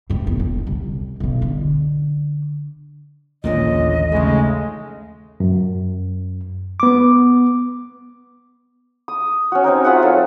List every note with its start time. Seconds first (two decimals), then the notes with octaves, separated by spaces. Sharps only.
0.10 F1 C4
0.27 B3
0.39 D#2
0.67 C2
1.20 B1 D#3
1.42 D3
3.44 A1 D#2 A#2 D3 F3 C#4 D#5
4.12 C#3 G#3 A3 D#4
5.40 F#2
6.80 B3 D6
9.08 D#6
9.52 C#4 F#4
9.64 C4 D#4 A#4
9.84 F4 G#4 E5 F#5
10.02 F#3 A4